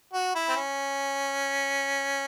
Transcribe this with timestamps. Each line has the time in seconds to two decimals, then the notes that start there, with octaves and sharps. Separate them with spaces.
0.13 F#4
0.35 E4
0.49 C4
0.56 C#4